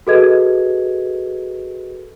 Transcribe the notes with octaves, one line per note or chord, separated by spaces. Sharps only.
F#4 G#4 A4 B4 D#5 G#6